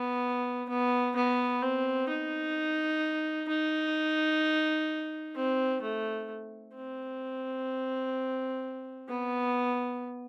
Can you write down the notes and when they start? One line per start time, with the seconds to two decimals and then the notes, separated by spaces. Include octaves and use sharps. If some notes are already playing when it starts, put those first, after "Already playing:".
Already playing: B3
0.69 B3
1.16 B3
1.62 C4
2.09 D#4
3.48 D#4
5.35 C4
5.82 A3
6.75 C4
9.08 B3